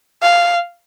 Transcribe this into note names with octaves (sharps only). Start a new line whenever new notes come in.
F5